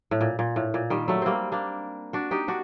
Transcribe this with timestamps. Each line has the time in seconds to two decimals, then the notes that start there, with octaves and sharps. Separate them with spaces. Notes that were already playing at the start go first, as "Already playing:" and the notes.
0.11 A2
0.21 A#2
0.39 A#2
0.56 A2
0.74 A#2
0.90 D#3 G3
1.08 F#3 A3
1.22 G3 A#3 C4
1.52 A#3 D4
2.13 D4 F#4
2.31 D#4 G4
2.48 D4 F#4